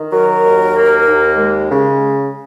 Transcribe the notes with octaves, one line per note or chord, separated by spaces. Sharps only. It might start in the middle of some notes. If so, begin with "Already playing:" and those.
Already playing: D#3
F#3 A#4
D#2
A#3
D#2
G#3
C#3